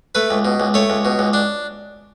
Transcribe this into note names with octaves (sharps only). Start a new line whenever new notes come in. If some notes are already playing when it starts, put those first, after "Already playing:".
A3 B4
C#2
B2
C#2
A3 C#5
C#2
B2
C#2
D4